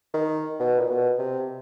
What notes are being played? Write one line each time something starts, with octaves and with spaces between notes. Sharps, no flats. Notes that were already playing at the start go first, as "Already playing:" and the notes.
D#3
B2
A#2
B2
C3